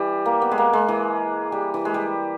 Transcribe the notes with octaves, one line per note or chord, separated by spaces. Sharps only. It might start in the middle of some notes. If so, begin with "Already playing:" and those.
Already playing: E3 G3
A#3
B3
G#3
A#3
G#3
E3
G3
E3
G#3
G3